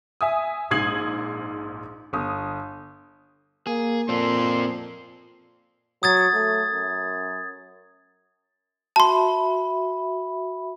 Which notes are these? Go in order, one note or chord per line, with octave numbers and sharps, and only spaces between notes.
E5 G#5 D#6
A#1 G#2 D#6 G#6 C7 F#7
G1 D#6
A#3 G#4
A#2 C4 A4 C6
F#3 D#6 G#6 A6
A3
F#2
F#4 E5 A5 B5 C6